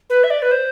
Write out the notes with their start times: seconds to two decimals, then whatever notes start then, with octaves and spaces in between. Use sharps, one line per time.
0.10 B4
0.24 E5
0.30 D5
0.42 B4
0.51 C5